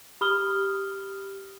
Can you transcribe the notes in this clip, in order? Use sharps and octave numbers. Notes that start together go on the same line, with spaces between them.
G4 B5 D#6 F6 G7